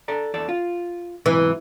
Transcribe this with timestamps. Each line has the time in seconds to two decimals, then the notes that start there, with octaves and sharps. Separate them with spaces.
0.08 A4 D5 A#5
0.34 E2 A4 D5
0.49 F4
1.26 B1 G#2 C3 E3